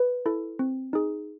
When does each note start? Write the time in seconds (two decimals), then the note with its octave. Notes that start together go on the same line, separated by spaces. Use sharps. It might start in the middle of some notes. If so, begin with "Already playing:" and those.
Already playing: B4
0.26 E4 A4
0.59 C4
0.93 D#4 G#4